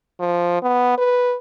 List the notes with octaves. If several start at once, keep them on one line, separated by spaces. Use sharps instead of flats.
F3
B3
B4